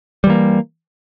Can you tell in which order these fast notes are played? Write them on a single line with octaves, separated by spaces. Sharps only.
G3 E3 A#3